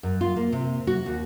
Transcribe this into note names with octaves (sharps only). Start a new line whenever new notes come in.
F#2
F4
A#3
C3
F#4
D#2